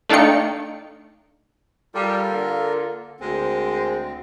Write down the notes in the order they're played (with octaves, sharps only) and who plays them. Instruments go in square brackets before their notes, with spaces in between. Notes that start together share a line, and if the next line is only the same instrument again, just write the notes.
[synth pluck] A3 D4 D#4 F5 G5 C#7
[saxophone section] G3 [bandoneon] F4 A4 A#4
[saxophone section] D3 A#3
[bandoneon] D2 C4 [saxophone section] G#3 A#4 C5